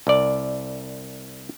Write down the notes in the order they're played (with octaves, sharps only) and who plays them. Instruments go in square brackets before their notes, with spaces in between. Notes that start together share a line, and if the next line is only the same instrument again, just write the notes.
[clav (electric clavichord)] C2 D5